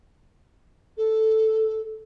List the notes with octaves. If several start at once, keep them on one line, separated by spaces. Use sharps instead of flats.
A4